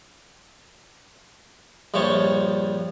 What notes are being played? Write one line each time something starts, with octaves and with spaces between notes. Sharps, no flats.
A#1 G2 F3 C#5 A5 C#6